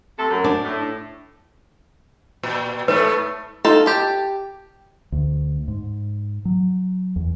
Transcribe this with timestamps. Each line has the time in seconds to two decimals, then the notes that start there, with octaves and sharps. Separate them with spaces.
0.17 C3 A3 A4
0.30 F#2
0.44 D4
0.64 A2
2.43 A#2
2.88 G#2 A3 B3 B4
3.65 D#4 F4 A4
3.86 G4 A5
5.12 D2
5.68 G#2
6.45 F#3
7.16 E2